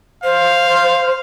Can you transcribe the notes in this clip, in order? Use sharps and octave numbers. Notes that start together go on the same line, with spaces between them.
C5 F5